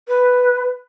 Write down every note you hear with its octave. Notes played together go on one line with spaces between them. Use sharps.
B4